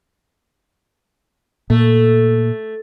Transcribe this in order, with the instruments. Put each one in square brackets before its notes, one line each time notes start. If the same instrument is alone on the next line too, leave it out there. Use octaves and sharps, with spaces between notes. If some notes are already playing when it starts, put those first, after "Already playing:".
[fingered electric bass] A#2 [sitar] A3